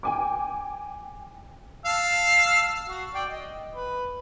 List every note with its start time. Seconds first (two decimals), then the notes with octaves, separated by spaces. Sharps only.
0.03 G5 G#5 D6
1.85 F5 A5 E6
2.88 F#4
3.14 D5 G5
3.30 D#5
3.73 B4